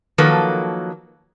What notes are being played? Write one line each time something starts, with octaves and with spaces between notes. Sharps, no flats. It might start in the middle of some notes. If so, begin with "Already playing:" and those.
D#3 F3 F#3 A#3 A4 B4